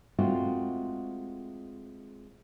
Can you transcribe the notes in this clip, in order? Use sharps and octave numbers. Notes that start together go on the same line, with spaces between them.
G#3 A3 C4 F4 F#4